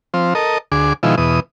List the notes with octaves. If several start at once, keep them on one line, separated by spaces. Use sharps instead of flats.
F3 C4
A4 A#4 D#5
D2 G#4 D6
B2 D#3 F3 G#3 E4
E2 B2 D#6